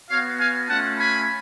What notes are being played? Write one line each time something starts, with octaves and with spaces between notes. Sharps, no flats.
B3 F#4 C#5 F5
F5 G#5
A3 C#4 F4 F#5 A5
G#5 B5